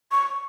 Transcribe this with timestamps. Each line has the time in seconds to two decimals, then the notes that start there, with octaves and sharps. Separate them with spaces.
0.11 C#6